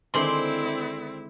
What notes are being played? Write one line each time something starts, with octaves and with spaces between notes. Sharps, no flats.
D3 D#3 G#3 C4 E4 C5 D5 C6